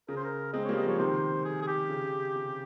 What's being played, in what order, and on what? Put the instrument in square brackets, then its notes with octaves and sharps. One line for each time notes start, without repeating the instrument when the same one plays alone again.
[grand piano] C#3 [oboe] A#4
[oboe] C5
A#4
[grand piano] G#3 C4 [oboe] D#5
[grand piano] G3 A#3 [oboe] C#5
[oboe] D#5
[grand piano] F3 G#3 [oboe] C#5
[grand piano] C3 D#3 [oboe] C5
[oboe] G#4
G#4
G4
[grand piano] C#3
C3